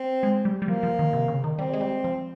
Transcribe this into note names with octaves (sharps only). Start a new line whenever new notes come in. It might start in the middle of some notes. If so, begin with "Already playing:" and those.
Already playing: C4
G#3
G3
G3
F3 A#3
F3
D#3
C3
C#3
D#3
G3 C4
G#3
G3
F3